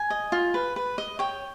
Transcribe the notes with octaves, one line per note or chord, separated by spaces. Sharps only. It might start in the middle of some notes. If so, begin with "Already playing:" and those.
Already playing: G#5
D#5
F4
B4
B4
D#5
C#5 G5